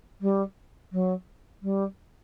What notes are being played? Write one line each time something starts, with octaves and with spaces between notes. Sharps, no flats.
G3
F#3
G3